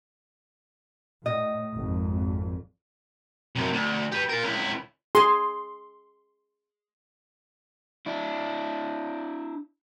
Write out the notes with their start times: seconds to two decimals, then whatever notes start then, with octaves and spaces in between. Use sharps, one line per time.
1.26 A2 D#5
1.74 G#1 F2
3.56 F#2 C3
3.73 D2
4.12 G4 B4
4.29 F4 A#4
4.43 C#2 E4
5.15 G#4 C6
8.06 D4 E4